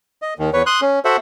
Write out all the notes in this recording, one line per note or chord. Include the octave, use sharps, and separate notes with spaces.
D#5
D#2 D#3
E2 B4 C#5
C6 D#6 F#6
C#4
F#4 A4 C5 E5 F#5